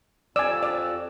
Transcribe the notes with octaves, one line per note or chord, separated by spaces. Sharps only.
F2 D5 G#5 E6
D5